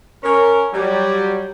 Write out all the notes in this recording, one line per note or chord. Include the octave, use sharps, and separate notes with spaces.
C#4 A#4
F#3 G3